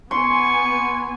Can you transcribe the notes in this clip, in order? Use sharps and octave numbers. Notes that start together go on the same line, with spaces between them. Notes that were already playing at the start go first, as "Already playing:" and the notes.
B3 G#5 C6 C#6